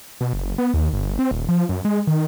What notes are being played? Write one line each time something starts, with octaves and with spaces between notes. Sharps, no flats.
B2
F#1
B3
D#2
G1
C4
D#1
F3
F#2
G#3
D#3